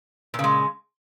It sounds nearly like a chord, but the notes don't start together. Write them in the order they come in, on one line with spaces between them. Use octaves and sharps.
A#2 C#3 G#3